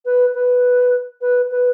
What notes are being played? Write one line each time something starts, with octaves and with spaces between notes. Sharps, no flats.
B4
B4
B4
B4